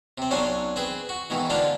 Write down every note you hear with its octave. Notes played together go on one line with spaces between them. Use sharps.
C3 C4
B1 F#3 C#4 D4 G#5 C6
C4 G#4 B4
F#4
G#2 B2 D#3 E3
G#2 D3 G#3 D4 D#4 F4